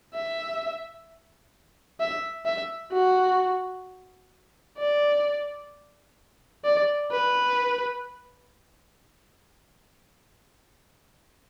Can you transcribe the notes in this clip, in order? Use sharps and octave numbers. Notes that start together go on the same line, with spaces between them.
E5
E5
E5
F#4
D5
D5
B4